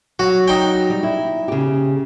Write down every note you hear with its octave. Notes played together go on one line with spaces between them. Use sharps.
F#3 F#4
D#4 G5
G3
E4
C#3 G4